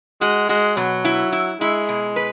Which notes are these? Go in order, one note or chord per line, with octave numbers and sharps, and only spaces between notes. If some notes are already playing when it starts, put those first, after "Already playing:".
G#3 F#4
G#3 F#4
B2 F#3
E4
E4
G#3 E4
B2
B4